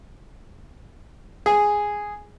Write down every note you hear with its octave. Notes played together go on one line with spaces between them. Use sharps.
G#4